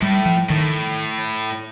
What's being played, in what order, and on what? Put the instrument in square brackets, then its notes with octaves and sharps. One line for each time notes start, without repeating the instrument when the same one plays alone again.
[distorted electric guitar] A2 [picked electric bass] G3
[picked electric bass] F3
[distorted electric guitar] A2 [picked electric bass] D#3